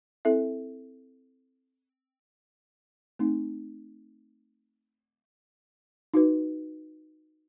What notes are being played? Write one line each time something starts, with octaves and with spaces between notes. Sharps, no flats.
C4 E4 A4 E5
A3 C4 D#4
D#4 F#4 B4